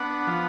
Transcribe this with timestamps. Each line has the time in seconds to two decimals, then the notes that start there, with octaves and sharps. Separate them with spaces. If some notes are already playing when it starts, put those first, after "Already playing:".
Already playing: B3 D4 F#5
0.27 F3